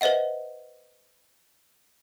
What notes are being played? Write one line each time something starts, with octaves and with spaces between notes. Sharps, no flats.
B4 C5 D#5 E5 F#5